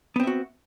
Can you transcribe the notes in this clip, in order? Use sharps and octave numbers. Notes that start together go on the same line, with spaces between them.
B3 C4 F#4 E5